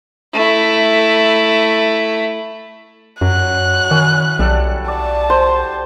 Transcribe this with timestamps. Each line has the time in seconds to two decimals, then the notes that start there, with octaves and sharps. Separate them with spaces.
0.33 A3 E4
3.21 F#2 F#3 F#6
3.91 D#3 C#4 E4
4.39 B1 G3 A4 F#5
4.88 D5 A5
5.30 C5